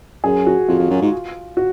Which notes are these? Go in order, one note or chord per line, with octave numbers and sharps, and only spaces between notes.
F#2 G#4
F#4
F2 F4
F2
F#2
G#2
F#4